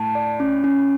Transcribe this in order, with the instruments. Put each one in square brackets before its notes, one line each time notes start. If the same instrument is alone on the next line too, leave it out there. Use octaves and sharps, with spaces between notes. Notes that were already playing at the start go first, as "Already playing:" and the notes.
Already playing: [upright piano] A2 [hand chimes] A5
[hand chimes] D5
C#4
C#4